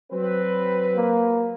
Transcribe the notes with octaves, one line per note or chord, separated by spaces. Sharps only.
F#3 C4 B4
A#3